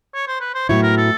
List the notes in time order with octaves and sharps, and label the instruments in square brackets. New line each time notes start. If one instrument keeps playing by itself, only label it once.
[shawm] C#5
C5
B4
C5
[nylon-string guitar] A2 F#3 B3 E4 [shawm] C#5
[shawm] A#4
A4